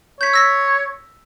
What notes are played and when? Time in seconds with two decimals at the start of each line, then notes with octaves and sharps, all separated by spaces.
0.21 C#5 G6 B6
0.33 E6 A#6 B6